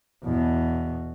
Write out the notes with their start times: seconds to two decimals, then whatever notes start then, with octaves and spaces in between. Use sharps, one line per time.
0.24 E2 B2